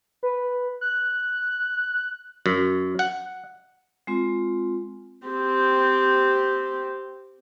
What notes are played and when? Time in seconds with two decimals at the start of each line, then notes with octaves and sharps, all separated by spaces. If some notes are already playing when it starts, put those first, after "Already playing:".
0.23 B4
0.81 F#6
2.46 F#2
2.99 F#5
4.07 G#3 C4 F4
5.27 C4 G4